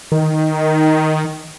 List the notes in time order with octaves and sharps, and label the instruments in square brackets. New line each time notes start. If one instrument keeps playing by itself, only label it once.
[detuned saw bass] D#3